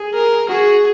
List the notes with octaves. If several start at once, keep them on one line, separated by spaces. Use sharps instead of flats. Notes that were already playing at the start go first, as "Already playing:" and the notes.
Already playing: G#4
A#4
F#4 G#4